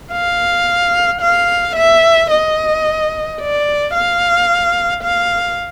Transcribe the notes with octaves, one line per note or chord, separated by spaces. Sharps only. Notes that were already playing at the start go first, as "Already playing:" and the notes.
F5
F5
E5
D#5
D5
F5
F5